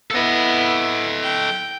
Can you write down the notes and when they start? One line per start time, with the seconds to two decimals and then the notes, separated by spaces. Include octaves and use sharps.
0.11 B3 E4 A4 D#5
1.23 G5